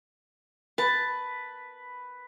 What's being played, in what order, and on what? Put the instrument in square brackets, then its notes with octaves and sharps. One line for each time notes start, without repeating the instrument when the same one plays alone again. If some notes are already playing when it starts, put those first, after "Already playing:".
[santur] B4 [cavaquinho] A5